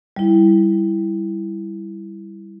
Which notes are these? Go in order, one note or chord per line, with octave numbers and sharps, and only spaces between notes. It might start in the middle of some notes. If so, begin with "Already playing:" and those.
G3 E4